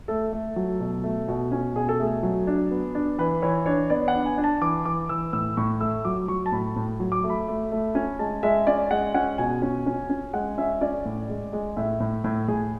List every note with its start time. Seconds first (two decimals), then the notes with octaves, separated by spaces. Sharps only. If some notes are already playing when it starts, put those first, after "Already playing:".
0.08 A3 A4
0.33 A3
0.56 F#3
0.80 B2
1.04 A3
1.28 B2
1.52 C#4
1.75 B2 G#4
1.89 A4
2.00 A3 G#4
2.23 F#3
2.47 D4
2.71 B3
2.95 D4
3.18 E3 B4
3.42 E3 C#5
3.66 D4 C#5
3.90 B3 D5
4.08 F#5
4.14 D4
4.26 G#5
4.38 D4
4.44 A5
4.61 E3 D6
4.85 E3 D6
5.09 E3 E6
5.33 A2 E6
5.57 A2 C#6
5.81 A3 E6
6.05 F#3 D6
6.28 F#3 C#6
6.46 A5
6.52 A2 B5
6.76 A2
7.00 F#3
7.12 D6
7.24 A3
7.30 B5
7.48 A3
7.72 A3
7.95 C#4
8.19 G#3 A5
8.43 G#3 E5
8.67 C#4 D5
8.91 G#3 F#5
9.14 C#4 F#5
9.38 B2 G#5
9.62 C#4
9.86 C#4
10.10 C#4
10.33 G#3 F#5
10.58 C#4 E5
10.81 C#4 D5
11.05 A2
11.29 G#3
11.53 G#3
11.77 A2 E5
12.00 A2
12.24 A2
12.48 A2 G#4